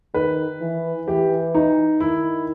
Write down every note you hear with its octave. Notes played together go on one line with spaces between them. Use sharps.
D#3 B4
E3
E3 G4
D#4
D#3 E4